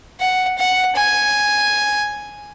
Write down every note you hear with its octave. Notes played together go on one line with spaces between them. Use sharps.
F#5
F#5
G#5